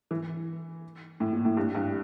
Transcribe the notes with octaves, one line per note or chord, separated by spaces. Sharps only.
E3
A2
A#2
A2
G2
G2